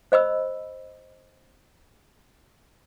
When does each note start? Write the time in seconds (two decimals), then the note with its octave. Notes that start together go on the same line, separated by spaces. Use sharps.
0.12 C5 D#5 B5 E6